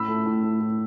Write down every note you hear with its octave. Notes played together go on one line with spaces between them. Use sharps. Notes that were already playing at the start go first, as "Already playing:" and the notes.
Already playing: A2 B5 E6
A3
A2
A3
A2